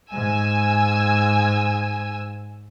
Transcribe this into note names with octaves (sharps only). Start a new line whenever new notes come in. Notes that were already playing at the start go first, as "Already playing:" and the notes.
G#2 G#5 E6